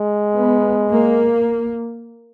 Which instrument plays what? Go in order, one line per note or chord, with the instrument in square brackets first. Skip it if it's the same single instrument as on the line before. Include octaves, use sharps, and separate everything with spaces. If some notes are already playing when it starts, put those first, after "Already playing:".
Already playing: [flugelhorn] G#3
[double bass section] B3
A#3